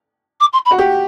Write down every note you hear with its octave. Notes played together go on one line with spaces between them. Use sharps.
D6
C6
B5
F#4
G4